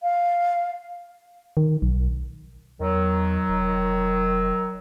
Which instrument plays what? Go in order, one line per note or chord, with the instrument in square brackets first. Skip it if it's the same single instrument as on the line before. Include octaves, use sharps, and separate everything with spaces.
[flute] F5
[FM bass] D#3
B1
[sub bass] E2 [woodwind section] D#3 F#3
[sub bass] F1